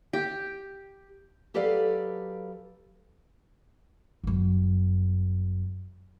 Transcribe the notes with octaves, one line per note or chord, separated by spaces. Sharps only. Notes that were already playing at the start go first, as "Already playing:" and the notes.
G4
F#3 G4 A4 B4 D5 F5
G1 F#2